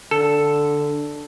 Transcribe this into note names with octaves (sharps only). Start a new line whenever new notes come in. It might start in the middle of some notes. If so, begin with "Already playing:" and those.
D3 A4